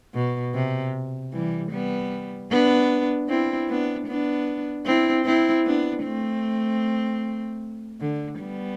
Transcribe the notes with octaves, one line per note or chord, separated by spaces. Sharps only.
B2
C3
E3 G3
G3 B3
B3 D4
C4 E4
B3 D4
B3 D4
C4 E4
C4 E4
B3 D4
A3 C4
D3
G3 B3